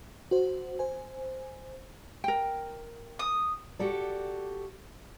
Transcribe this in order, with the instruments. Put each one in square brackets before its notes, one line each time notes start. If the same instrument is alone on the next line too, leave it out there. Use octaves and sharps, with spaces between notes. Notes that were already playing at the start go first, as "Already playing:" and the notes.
[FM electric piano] F#4 C5
C5 G#5
[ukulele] A#4 G5
[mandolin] D#6
[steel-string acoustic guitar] F#4 G4 A4 D5